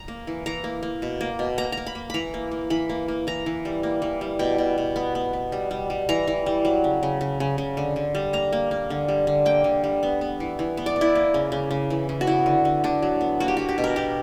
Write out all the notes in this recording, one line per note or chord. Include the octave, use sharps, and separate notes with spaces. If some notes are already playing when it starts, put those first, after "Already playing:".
Already playing: A#5
A#3
E3
E3 A#5
A#3
A#3
B2
A#3
B2
A#3 A#5
A#3 A#5
B5
A#3
E3 A#5 B5
A#3
A#3
E3 B5
A#3
A#3
E3 A#5
E3
G3
A#3
E3
G3
B2 G5
B2
B2
B3
B3
B3
G3
G3
G3
E3 A#5
E3
G3
F#3
C#3
C#3
C#3
C#3
C#3
D3
D3
G3
A#3 A#5
A#3
A#3
D3
G3
D3
A#3 G5
D3
G3
B3
B3
E3
E3
B3
D5
B3
E4
A#3
C#3
C#3
C#3
E3
C#3
F#4
B3 E4
D3
D3
D3 D4
F#3
B3
A#3 F#4
G4
A#3 F#4
G4
B2
A#4
B2 G4